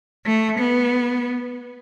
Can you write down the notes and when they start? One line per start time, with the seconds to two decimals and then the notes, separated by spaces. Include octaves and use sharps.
0.26 A3
0.58 B3